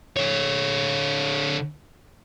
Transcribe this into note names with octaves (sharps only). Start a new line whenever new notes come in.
D3 C#5